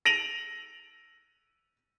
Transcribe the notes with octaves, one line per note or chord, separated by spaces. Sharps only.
A#6 D7 D#7 F7 F#7